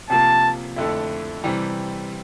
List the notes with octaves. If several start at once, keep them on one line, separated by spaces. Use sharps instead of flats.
C3 F3 A#3 A5
F2 D3 A3 E4
C3 E3 G3